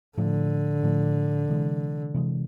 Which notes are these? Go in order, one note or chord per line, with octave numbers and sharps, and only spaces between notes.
A2 D3 F3 A3
A2 F3 A3
C3 E3 G#3
C3 E3 G#3